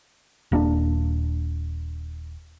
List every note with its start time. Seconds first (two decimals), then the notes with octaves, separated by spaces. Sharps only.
0.52 D#1 A#3 C#4 D4